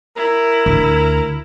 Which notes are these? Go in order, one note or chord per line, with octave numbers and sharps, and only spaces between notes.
E4 A#4
D2